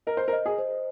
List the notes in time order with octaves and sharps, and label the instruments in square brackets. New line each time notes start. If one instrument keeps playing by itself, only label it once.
[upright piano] A#4 [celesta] D#5
[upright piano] C5
A#4
[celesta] D#5
[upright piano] G#4
[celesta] C5